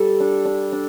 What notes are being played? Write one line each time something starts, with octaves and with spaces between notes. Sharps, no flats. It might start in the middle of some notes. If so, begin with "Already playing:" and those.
Already playing: G3 A4
D4
D4
D4